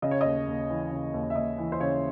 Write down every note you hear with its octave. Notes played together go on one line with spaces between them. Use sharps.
C#3 D#5
C#5
D#2 D#5
D#2
E3
C#3
D#2
E5
D#2 D#5
E3
C5
C#3 C#5